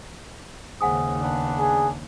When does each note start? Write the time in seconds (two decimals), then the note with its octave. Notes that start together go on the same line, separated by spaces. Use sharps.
0.81 D#2 G#2 C#3 F#5 G#5 D#6
1.21 B3 D4
1.59 G#4